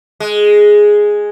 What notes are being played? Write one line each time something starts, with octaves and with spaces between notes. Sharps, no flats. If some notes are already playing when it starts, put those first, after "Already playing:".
G#3